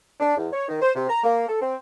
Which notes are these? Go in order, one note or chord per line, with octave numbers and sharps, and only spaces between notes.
D4
E2
C#5
D#3
C5
C3
A#5
A#3
A4
C4